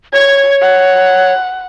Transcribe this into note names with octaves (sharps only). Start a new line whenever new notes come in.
C#5 G#6
F#5